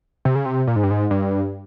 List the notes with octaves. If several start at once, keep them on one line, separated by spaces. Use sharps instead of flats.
C3
C#3
C3
A#2
G#2
G2
G#2
G2